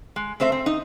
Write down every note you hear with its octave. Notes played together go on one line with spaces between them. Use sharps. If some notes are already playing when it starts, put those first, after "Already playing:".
G#3
A3 C4 C5 E5
C4
D#4